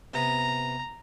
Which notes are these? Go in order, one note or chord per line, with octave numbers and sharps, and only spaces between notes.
C3 B3 A#5